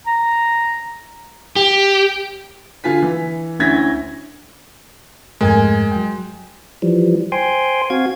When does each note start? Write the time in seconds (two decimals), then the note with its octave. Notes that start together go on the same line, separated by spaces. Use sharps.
0.07 A#5
1.56 G4
2.84 D3 F4 G#5 B6
3.02 E3
3.59 D2 C#4 E4 G#6 A#6 B6
5.41 F2 G#2 G#3 A3 A#4 G#5
5.92 F#3 G5
6.82 E3 F3 G3
7.32 C5 G5 G#5 C6
7.90 C4 F#4 F5 G#6